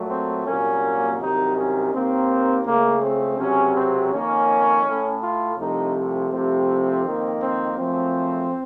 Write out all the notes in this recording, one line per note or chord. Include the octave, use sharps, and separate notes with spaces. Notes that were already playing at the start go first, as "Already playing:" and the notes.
Already playing: A#2 F#3 A3
C4
C2 A#2 F#3 A#3 C#4
C2 C3 D#3 F#3 D#4
C#4
D#2 D#3 A#3 C4
C#2 C#3 A3 A#3
C4
C#2 C3 F#3 C#4
C4
F2 D#3 A#3 C#4
A2 A3
F4
C2 C3 F3 A3 D#4
C2 C3 F3 A3 C4
F2 D#3 A#3
C4
F#2 F3 A3 C4